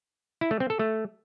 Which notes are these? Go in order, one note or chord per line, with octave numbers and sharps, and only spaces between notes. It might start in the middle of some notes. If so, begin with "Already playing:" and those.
E4
A3
C4
A4
A3